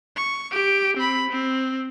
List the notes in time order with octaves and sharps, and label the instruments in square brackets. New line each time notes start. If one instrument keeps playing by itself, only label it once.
[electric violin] C#6
G4 D7
C4 B5
C4